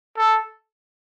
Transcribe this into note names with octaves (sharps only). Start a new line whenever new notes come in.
A4